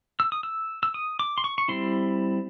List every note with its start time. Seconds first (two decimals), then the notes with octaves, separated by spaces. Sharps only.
0.20 E6
0.32 D#6
0.43 E6
0.83 E6
0.94 D#6
1.19 D6
1.38 C6
1.44 C#6
1.58 C#6
1.68 G3 C4 E4 C6